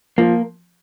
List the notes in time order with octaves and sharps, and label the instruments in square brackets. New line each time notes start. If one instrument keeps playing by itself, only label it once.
[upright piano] F3 [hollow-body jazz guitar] A#3